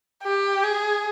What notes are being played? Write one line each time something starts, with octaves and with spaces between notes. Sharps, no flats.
G4
G#4